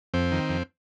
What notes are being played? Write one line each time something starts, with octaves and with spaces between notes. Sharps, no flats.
F2 C4
D#3
F2